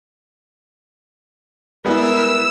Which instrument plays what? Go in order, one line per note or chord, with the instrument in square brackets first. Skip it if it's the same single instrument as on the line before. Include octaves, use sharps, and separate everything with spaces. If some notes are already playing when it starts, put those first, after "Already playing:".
[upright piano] G3 G#3 B3 [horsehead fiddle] E4 B4 [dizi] A#4 [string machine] E6